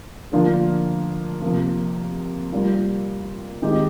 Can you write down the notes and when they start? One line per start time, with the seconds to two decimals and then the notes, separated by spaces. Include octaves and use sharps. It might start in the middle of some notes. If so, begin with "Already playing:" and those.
0.32 D3 F3 A#3 D4 F4
1.41 C3 F3 A#3
2.52 G3 A#3 F4
3.62 D#3 G#3 C4 D#4 G4